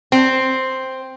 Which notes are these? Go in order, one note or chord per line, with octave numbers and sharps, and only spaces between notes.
C4